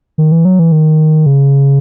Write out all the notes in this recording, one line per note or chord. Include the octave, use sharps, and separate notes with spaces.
D#3
E3
F#3
E3
D#3
C#3